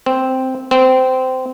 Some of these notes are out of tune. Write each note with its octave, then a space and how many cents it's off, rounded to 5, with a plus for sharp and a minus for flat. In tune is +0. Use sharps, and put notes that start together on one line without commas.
C4 -5
C4 -20